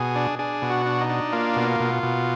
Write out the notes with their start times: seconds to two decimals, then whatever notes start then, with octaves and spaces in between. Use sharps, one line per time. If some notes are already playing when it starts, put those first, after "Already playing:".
Already playing: B2 G#4
0.16 D4
0.39 D4 G#4
0.62 B2
0.70 F#4
0.86 D4
1.01 D#4
1.09 D4
1.32 A#3 F4
1.56 B2
1.80 B2
2.03 B2